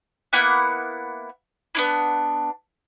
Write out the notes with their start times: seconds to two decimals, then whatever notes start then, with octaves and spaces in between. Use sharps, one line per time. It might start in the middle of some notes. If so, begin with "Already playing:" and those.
0.33 A#3 B3 E4 F#5
1.75 B3 D4 E4